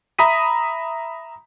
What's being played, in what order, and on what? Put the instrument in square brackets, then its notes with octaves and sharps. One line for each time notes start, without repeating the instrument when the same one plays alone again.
[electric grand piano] E5 A#5 B5 D#6 B6 D#7